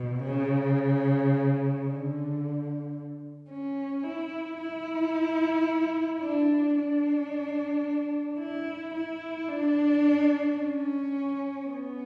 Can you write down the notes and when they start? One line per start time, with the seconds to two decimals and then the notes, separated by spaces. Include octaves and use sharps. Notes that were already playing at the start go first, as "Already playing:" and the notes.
Already playing: B2
0.23 C#3
1.87 D3
3.50 C#4
4.04 E4
4.58 E4
6.22 D4
6.76 D4
8.39 E4
8.94 E4
9.49 D4
10.57 C#4
11.66 B3